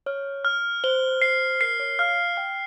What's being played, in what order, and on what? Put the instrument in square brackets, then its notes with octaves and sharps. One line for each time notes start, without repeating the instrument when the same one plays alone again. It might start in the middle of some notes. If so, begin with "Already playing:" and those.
[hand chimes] C#5 [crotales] F6
[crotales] F6
[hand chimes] C5 [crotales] G7
[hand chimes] C5 [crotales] C7
[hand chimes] A#4 [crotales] C7
[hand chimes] C#5
[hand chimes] F5 [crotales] F6
[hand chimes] G5 [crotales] F6